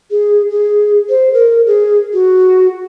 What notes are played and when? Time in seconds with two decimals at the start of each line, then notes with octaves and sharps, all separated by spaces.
0.11 G#4
0.50 G#4
1.09 C5
1.33 A#4
1.66 G#4
2.13 F#4